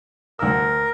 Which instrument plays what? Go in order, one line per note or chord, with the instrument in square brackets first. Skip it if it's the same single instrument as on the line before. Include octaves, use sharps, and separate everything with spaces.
[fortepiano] D2 E6 [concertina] A#4